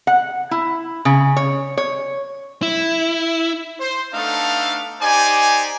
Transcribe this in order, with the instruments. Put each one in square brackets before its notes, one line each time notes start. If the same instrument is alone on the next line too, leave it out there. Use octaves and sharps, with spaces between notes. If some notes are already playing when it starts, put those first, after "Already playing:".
[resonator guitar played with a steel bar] F#5
E4
C#3
C#5
C#5
[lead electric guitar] E4
[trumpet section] C5
A3 B3 D4 D#4 A4 F5
D#4 G4 C5 D5 G#5